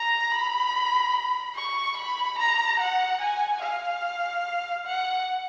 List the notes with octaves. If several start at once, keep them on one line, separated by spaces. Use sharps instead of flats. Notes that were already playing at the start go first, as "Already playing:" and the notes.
Already playing: A#5
B5
C#6
B5
A#5
F#5
G#5
F5
F#5